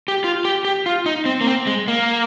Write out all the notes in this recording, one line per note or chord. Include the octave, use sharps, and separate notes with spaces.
G4
F4
G4
G4
F4
D#4
C4
A#3
C4
G#3
A#3